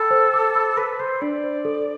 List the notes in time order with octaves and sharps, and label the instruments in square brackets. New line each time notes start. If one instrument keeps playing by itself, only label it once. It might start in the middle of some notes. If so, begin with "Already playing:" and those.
Already playing: [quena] A4 [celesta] G5 B5
[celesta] C5
D6
B5
[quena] B4 [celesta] B5
[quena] C5 [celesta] B5
[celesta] D4 [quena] D5
[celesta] C5
A4